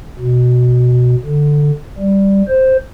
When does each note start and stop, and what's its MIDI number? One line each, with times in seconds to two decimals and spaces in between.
0.19 1.15 47
1.25 1.71 50
1.98 2.42 55
2.48 2.77 72